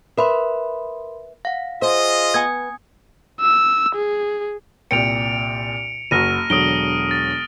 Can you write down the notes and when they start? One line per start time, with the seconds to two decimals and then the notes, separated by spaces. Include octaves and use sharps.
0.17 A#4 B4 E5 B5 C6
1.45 F5 F#5
1.82 F4 G#4 C5 D#5
2.34 B3 G#5 D#6 G#6
3.41 E6
3.95 G#4
4.91 C2 A#2 G5 C#7 D7 F7
6.11 F#1 F#4 F6 A#6 D#7
6.50 E1 D3 F#3 D#6 D7 G7
7.11 A6